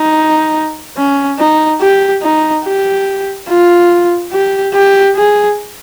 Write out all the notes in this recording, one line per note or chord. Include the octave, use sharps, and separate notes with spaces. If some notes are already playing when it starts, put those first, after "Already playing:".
Already playing: D#4
C#4
D#4
G4
D#4
G4
F4
G4
G4
G#4